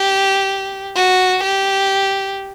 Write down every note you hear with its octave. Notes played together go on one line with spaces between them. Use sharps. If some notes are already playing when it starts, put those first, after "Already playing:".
Already playing: G4
F#4
G4